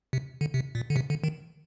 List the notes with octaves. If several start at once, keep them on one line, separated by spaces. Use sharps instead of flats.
C3
D3
C3
A#2
D3
C3
D3
D#3